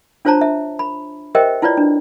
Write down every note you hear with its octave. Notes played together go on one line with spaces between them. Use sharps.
D4 F4 C5 C#5 A5 A#5
E5
B5
G4 A#4 C5 D#5 E5 G5
E4 F4 B4 C#5 D5
D4